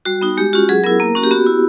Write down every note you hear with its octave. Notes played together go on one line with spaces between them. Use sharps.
G3 F#4
B3 D#4 F#4
G#3 G4
C#4 F4 F#4
F#3 G#4
B3 E4 A#4
A#3
C#4 F#4
G4
B3 F#4
E4